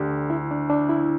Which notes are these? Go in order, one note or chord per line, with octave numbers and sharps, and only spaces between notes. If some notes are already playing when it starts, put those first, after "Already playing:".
Already playing: D2 D4 G4 A4 D5
E4
D4
D4
E4